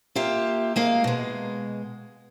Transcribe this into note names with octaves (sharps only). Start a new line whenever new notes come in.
A#3 F4 G4 E5
G#3 A#3 F5
B2 G#3